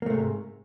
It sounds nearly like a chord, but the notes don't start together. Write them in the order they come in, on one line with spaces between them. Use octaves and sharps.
A#3 A3 C3 G#2